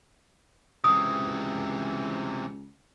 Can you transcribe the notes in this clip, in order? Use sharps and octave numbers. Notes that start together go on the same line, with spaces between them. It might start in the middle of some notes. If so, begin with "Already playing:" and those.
C#2 C3 E3 D#6